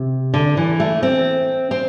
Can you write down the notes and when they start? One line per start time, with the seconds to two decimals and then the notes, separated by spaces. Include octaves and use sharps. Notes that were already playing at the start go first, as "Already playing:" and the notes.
Already playing: C3
0.34 D3
0.57 E3
0.80 A3
1.03 C4
1.71 C4